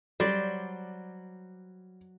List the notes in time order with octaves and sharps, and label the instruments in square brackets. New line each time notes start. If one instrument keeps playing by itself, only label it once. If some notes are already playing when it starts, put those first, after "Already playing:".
[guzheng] F#3 C5 D5 [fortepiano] G3